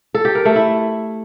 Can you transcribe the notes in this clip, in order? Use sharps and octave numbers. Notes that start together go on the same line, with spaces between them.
A4
G4
A#4
A3
E4